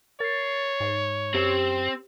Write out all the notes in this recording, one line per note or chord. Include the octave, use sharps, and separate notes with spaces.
A#4 C#5 A6 C7
G#2
F#2 C4 G4 E7